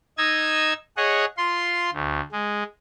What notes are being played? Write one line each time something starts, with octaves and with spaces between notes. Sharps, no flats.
D#4 D#5 E6 G#6
G#4 C#5 D#5 F#5
F4 C6
D2
G#3